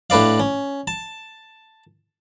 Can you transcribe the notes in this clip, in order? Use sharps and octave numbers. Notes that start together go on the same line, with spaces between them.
A2 D4 B4 D5 F5
C#4
A5